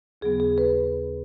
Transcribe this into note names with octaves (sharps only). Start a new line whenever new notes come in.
D#2 C#3 F#3 B3 G#4
G#4
B4